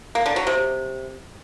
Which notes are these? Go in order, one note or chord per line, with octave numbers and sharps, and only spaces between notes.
A#3
D3
F#3
C3